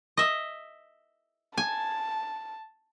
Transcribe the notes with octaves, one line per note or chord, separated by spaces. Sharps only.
D#5 E5
G#5 A5